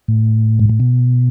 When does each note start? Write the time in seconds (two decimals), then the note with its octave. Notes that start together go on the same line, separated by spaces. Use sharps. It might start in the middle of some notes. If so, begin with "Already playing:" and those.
0.08 A2
0.59 G#2
0.69 A2
0.80 B2